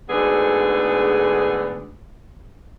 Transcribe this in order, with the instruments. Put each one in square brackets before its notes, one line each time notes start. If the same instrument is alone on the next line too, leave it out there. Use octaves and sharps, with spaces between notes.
[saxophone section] D2 G#2 D3 B3 G#4